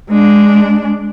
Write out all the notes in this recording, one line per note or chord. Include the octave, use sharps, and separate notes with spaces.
G#3 D4